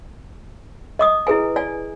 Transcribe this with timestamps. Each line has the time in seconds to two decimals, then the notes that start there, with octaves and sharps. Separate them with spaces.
0.99 D#5 D6 D#6
1.27 E4 G#4 B4 G#5
1.56 D5 G#5